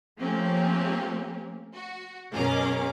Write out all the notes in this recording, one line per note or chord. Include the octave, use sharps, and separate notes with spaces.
F3 A3 A#3 C4 C#4 G4
F#4
F#2 B2 C#4 G#4 A#4 D6